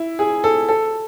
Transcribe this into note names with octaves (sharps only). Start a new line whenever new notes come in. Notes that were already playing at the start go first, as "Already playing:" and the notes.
Already playing: E4
G#4
A4
A4